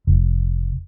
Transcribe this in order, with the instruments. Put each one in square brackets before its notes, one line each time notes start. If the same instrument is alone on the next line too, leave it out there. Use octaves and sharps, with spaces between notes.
[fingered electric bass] F1